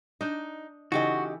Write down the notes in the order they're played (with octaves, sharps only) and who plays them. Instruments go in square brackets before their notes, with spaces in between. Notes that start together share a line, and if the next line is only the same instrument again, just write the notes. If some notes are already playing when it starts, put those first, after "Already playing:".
[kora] D4 D#5 [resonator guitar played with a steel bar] D#4
[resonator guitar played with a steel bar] C#3 G4 D#5 [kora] E3 A4 [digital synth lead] D#4 [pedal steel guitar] F#4